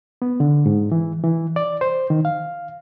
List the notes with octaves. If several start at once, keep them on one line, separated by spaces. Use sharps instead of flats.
B3
D3
G#2
E3
E3
D5
C5
D#3
F5